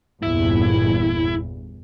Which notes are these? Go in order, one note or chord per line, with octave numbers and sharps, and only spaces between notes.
G1 E2 A#2 E4